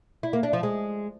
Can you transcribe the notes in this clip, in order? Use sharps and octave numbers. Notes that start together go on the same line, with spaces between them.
E4
A#3
D4
F3
G#3